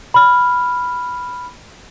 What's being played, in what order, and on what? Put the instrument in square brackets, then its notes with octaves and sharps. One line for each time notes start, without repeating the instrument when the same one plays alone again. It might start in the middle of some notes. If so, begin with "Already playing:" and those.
[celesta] B5 F6